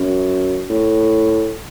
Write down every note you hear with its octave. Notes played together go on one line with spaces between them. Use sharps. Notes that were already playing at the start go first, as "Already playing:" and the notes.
Already playing: F#2
A2